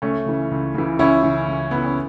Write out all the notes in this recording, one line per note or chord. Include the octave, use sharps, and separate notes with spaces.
C#2 A3 C#4
C#3 E3
C#2
C#3 E3
C#2 C#4 E4
C#3 E3
C#2
C#3 E3 B3
C#4